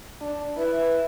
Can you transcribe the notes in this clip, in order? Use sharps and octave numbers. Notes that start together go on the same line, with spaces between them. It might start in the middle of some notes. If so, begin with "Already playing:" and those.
D4
E4 B4